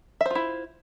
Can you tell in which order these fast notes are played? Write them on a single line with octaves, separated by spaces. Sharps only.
E5 C5 F4 E4